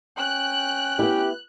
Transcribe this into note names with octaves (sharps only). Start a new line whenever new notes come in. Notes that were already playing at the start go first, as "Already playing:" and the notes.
C#4 G5 F#6
B3 E4 G4